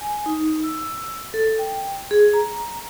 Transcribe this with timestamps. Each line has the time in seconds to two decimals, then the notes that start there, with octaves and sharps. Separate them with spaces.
0.01 G#5
0.26 D#4
0.64 E6
1.34 A4
1.59 G5
2.11 G#4
2.34 A#5